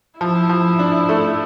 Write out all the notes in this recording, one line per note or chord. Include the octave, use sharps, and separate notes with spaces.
F3 E4
F3
D4
A3